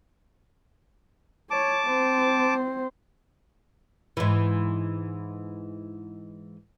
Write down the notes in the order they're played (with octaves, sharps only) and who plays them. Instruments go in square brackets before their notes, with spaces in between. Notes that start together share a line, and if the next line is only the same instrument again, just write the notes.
[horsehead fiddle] C#5 [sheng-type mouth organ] A5 D6
[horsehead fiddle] C4 C5
[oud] G#2 E3